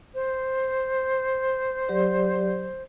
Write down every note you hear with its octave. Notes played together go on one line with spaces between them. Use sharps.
C5
F#3 G4 D5